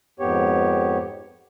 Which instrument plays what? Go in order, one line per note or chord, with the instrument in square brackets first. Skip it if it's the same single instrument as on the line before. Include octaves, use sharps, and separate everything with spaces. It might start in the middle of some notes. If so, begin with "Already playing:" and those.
[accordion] F2 G#2 B3 G4 C#5